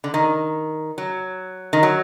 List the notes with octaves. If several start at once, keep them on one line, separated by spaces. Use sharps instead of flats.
D3
D#3
F#3
D#3
F#3